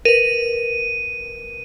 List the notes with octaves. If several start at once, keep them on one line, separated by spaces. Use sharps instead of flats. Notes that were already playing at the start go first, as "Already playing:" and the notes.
A#4 B4 D#7